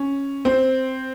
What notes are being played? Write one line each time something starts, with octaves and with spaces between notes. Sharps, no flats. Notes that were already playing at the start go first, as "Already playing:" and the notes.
Already playing: C#4
C4